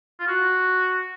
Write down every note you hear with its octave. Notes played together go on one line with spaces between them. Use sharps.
F4
F#4